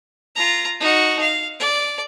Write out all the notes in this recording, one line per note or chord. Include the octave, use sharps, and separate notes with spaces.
F4 A#5
D#4 F#4
F5
D5